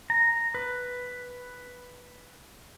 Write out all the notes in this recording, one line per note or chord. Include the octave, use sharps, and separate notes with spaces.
A#5
B4